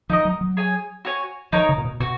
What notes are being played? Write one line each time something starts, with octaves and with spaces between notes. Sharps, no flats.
F3 D#4 A#4 D#5
F#3
F#3
G#4 C#5 G#5
F#4 C#5 G#5
F3 D#4 A#4 C#5
C#3
A#2
B2
B2 F#4